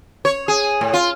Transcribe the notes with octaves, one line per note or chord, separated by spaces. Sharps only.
C#5
G#4
A2
F4